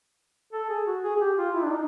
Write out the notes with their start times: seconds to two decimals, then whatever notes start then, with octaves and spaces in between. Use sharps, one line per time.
0.53 A4
0.69 G#4
0.87 F#4
1.04 G#4
1.16 G#4
1.21 G4
1.38 F4
1.55 E4
1.63 D4
1.71 D#4